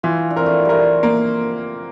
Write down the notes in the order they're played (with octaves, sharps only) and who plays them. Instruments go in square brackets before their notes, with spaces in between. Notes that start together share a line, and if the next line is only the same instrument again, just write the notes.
[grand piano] E3 [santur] F4
[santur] D4
[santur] C4 [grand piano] A#4
[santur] A3
A#3
[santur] G3 A3 [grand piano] A#4
[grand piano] A#3